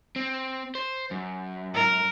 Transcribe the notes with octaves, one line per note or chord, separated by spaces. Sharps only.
C4
C5
F#2
A#4